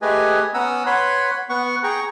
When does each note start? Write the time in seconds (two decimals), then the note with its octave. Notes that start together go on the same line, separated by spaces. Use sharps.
0.02 A3 G4 G#4 B4 D#5 G#5
0.54 B3 C#4 F#5 A#5 D#6 E6
0.86 B4 C#5 F#5 B5 C6
1.49 B3 F#5 C#6
1.83 G#4 G5 A#5 C#6